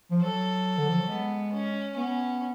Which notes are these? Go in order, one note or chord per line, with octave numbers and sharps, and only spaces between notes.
F3
F#3 A4
D3
F3
F#3
G#3 B3
C#4
B3 C#4